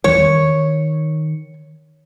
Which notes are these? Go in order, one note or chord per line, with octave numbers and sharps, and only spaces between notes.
E2 E3 G3 C#5
D#3